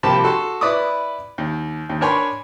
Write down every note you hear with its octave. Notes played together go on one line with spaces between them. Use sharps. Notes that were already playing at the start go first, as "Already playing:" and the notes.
C2 F3 A#3 G4 A5 B5
F#4 A4 C6
E4 B4 D5 B5 D6 D#6
D#2
D#2
D4 A#4 C#5 G#5 B5 C6